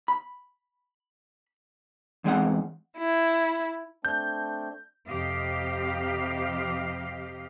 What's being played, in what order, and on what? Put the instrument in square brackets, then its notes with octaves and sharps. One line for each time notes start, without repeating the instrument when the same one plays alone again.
[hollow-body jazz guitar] B5
E2 G#3 C4 F#5
[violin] E4
[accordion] A3 C4 D4 [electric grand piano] G6
[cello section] F2 C3 G4 D#5 F5